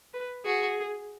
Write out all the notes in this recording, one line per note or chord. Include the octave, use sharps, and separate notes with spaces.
B4
F#4 G#4